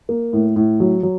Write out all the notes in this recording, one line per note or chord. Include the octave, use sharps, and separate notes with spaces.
A#3
A2
A2
F#3
F#3